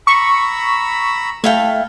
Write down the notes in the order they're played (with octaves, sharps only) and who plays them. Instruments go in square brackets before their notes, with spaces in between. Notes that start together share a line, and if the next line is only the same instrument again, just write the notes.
[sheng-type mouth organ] A#5 B5 E6 [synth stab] C#6
[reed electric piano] A3 E5 [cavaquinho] E4 F5 G5 [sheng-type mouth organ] A4